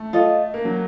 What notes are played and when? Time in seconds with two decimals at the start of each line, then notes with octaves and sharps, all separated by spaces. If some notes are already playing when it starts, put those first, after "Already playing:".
Already playing: A3
0.13 F4 A4 D#5
0.54 A#3
0.65 F#3